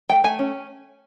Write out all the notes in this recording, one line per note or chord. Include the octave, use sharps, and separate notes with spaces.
A3 G5
A3 G#5
C#4